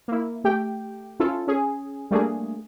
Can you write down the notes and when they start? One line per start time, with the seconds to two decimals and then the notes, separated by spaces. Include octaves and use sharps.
0.08 A#3 E4
0.44 A3 G4 G5
1.20 C#4 E4 F4 A4
1.48 C#4 G#4
2.11 G3 A3 A#3 D4 G#4